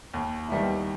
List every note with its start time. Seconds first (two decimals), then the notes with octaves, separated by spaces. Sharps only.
0.14 D#2
0.49 D#3 G3 B3 E4